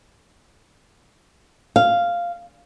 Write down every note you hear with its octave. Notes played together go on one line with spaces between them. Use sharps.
F5